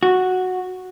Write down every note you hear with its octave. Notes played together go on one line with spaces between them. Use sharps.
F#4